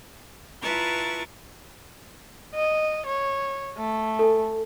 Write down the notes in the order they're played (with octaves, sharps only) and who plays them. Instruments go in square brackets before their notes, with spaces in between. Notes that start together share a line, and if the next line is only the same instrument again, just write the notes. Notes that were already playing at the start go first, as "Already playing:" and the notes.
[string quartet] E4 F4 B4 A5 A#5 C#6
[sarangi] D#5
C#5
A3
[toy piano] A4 G#5